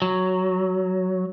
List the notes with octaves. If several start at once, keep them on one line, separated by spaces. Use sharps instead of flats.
F#3